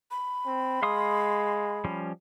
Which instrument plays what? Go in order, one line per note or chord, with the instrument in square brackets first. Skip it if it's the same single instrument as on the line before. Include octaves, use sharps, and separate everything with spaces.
[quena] B5
[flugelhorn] C4
[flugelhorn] G#3 [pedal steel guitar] F5 C6 D#6
[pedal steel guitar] F3 G3 C#4